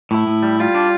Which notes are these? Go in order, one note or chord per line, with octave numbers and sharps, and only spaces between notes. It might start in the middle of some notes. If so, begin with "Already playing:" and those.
A2 E4
A2
G3
G3 F4
D4